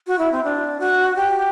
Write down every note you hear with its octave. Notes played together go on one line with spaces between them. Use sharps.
F#4
E4
C4
D4
F#4
G4